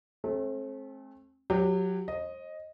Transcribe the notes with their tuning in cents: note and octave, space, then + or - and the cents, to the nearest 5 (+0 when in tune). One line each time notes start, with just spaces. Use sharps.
A3 -30 C4 +35
F#3 -20 G4 +0
C5 +40 D#5 +0